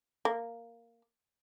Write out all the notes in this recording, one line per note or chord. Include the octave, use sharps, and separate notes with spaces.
A#3